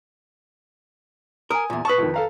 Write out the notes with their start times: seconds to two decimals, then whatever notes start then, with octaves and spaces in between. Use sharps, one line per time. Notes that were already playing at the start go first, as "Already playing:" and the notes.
1.50 A#4 G#5 D#6
1.70 E2 A#2
1.85 B4 A5 C#6 D#6
1.98 F2 D#3
2.14 A4 F5 A#5